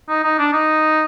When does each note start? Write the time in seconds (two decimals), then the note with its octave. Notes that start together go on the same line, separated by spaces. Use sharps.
0.09 D#4
0.24 D#4
0.38 D4
0.53 D#4